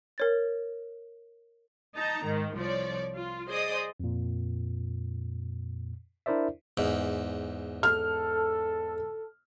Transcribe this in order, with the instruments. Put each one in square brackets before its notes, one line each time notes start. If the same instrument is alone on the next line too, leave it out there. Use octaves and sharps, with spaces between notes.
[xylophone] A#4 C#5 A6
[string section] D#4 A5 A#5
G#2 D#3
C2 F3 C#5 D5
F4
G#4 C5 D5 D#5 D#6
[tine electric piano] F2 A#2
D4 E4 A#4 C5 D5 E5
[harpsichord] E2 G#2
[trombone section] A4 [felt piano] F6